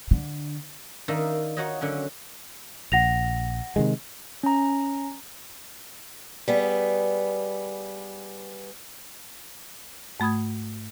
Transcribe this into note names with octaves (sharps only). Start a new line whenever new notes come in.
D3
D#3 D4 D#4 E5 F5
D#4 F4 F#4 C#5 D#5
D3 F#3 C#4
A#1 F#5 A#6 F7
C3 D#3 G#3
C#4 A#5
G3 B3 G#4
G#2 A3 B5 D#6 G#6